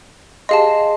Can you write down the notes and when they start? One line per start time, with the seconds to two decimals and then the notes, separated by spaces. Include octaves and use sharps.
0.49 G4 G#4 D#5 F5 A5 C6